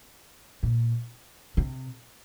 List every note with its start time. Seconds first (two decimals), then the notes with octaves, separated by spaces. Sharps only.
0.63 A#2
1.57 C3